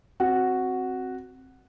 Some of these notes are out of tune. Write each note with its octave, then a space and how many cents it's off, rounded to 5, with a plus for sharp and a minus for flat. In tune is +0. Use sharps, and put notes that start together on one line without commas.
C4 +5 F#4 +0